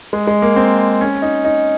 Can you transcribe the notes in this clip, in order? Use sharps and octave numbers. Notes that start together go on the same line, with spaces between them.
G#3
G#3
A#3
C4
C#4
D#4
D#4